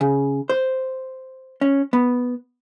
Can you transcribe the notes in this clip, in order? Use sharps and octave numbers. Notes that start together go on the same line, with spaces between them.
C#3
C5
C#4
B3